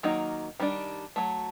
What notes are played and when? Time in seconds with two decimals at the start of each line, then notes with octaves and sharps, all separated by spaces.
0.03 D#3 F#3 A#3 D#4
0.60 D#3 G3 D4
1.16 F#3 A3